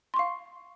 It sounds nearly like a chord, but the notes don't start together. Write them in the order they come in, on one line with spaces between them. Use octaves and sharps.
C6 C#6 F5